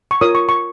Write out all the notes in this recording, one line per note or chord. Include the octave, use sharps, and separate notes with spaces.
C#6
F4 A#4 C#5 D#6
C#6
C#6